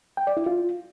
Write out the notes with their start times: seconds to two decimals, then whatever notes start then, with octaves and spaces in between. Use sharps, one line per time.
0.17 G5
0.27 D5
0.37 E4
0.46 F4